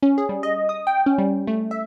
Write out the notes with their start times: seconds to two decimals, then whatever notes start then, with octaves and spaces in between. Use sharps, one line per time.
0.03 C#4
0.18 G#4
0.29 G3
0.43 D#5
0.69 D#6
0.87 G5
1.06 C#4
1.18 G3
1.47 A3
1.71 E5